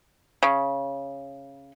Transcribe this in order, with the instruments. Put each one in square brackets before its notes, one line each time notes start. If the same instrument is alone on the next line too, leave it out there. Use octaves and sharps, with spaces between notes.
[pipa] C#3